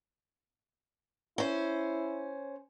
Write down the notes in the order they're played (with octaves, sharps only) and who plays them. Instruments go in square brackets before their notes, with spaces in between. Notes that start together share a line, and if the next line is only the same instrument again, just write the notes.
[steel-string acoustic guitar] C#4 C5 [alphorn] E4